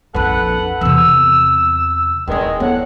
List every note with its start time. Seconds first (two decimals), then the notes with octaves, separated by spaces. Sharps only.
0.15 A#1 F2 A4 B4 F#5
0.81 E2 C3 E6
2.28 D#1 E2 D#3 G#3 D#4
2.60 A2 B3 F#5